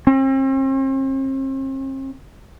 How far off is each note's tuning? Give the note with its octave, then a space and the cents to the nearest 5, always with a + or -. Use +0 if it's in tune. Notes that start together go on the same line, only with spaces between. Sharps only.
C4 +45